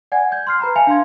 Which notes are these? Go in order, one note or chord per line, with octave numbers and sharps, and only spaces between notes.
D5 F#5 G#5 G#6
G6 G#6
C6 F6 C7
B4 A#5 B5
E5 F5 G#5 A5 C#7 F7
D4 F5 C6 G#6